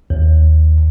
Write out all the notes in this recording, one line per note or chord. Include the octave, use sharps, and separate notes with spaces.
D#2